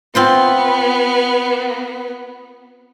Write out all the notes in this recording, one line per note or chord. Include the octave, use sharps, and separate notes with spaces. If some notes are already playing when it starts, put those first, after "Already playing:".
B3 C4 F4 C5